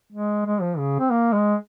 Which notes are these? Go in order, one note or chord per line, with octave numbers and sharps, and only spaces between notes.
G#3
G#3
F3
C#3
C4
A#3
G#3